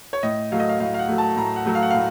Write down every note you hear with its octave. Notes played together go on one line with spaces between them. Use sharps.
C#5
A2 D#5
F#3 A3 F5
D#5
F5
A2 F5
F5
F#5
F#3 A3
A5
A2 A#5
F#5
F#3 A3
F5
F#5
A2 F5